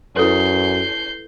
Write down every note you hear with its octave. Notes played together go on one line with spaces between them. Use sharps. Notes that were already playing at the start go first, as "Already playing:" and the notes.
F#2 E4 A4 B4 G6 C7